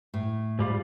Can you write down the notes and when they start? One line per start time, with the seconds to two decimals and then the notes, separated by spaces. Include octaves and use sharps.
0.14 A2
0.59 G#2 G3 F4